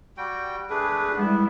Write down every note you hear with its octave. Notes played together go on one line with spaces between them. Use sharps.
G3 F#4 G5
A3 D4 G#4 B4
G3 G#3 B3 E4